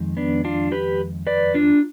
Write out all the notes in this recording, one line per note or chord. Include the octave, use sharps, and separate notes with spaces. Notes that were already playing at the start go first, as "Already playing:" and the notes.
Already playing: F2 D#3 G#3
B3 D4
D4 F4
G4 B4
B4 D5
D4 F4